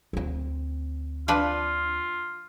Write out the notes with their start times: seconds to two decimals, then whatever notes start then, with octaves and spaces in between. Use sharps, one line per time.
0.13 D2 C4
1.28 F3 D4 F4 B4